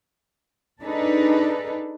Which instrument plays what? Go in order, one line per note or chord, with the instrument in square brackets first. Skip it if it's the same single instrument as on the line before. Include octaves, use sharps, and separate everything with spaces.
[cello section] D4 D#4 G#4 A4 B4